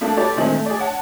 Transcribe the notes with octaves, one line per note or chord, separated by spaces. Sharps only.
A3 A#3 D4 A4
F#4 G4 A4 B4 C#5 D5
A#2 D3 D#3 G#3 A3 C4
A3
G#4 D5
C#5 F#5 A5